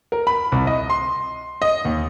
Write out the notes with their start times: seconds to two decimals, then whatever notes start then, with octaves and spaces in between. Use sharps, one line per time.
0.12 A#4
0.27 B5
0.52 C2
0.67 D#5
0.90 C6
1.62 D#5
1.85 D#2